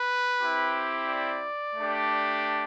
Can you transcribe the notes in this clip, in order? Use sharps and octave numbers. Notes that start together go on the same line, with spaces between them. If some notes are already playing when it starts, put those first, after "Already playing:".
Already playing: B4
C4 E4 G4
D5
A3 D4 G4